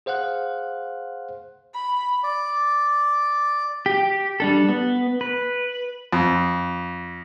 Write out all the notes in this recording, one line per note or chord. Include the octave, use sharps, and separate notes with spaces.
G#4 C5 F5 F#5 F#6
B5
D5
G4
G3 D4 A4
B3
B4
F2